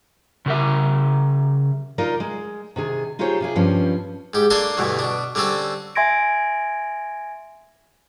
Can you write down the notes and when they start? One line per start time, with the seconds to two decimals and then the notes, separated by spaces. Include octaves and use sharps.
0.46 C#3 A#4 E5
1.98 D#4 F4 A#4 D5
2.20 G#3
2.76 C3 D#3 G#4
3.19 D#4 F4 G4 G#4 C5 C#5
3.41 C3 F4 G#4
3.55 G2 F3 C4 C#4
4.34 G#2 G4
4.50 A#3 D4 A4 G#5 C6 C#6
4.77 D2 G2 B2 E3
4.99 B2 D4
5.35 D3 G3 C4 C#4 A4
5.95 E5 G#5 C6 G#6 A#6 D7